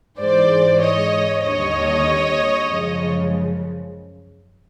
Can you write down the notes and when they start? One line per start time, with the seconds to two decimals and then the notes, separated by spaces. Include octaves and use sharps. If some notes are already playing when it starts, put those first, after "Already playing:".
0.19 G#2 E3 G#3 C5 D5
0.81 C#5 D#5
1.42 D#2 D3 G3 C#5 D#5
2.66 F#2 C#3 F3 G#3